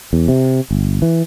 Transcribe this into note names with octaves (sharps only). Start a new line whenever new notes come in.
E2
C3
G1
E3